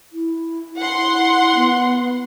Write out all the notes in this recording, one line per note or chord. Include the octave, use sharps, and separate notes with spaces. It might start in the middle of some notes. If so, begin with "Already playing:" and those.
E4
F#5 C6
B3